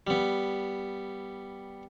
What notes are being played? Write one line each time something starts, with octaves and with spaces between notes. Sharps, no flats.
G3 B3